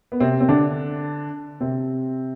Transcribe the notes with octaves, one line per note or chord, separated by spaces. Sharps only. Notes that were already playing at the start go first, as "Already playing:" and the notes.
B3
C3 C4
C4
D3 D4
C3 C4